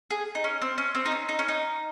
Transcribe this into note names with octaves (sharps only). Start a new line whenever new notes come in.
G#4
D#4
C#4
C4
C#4
C4
D#4
C#4
D#4
C#4
D#4